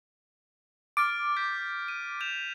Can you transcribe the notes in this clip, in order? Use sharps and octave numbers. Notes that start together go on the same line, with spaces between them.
D6 F6 A6 D7
G6 B6
D#7
G6 E7 F7